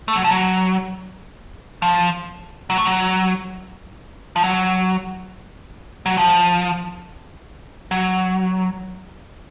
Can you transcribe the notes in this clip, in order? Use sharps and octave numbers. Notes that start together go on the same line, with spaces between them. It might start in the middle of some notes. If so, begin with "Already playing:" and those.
A3
F#3
F3
F#3
F3
F#3
A3
F#3
F3
F#3
F#3
F3
F#3